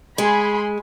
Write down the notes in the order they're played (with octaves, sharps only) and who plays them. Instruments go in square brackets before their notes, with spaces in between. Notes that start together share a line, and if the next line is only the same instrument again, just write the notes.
[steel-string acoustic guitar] G#3 [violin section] G#4 B5 C6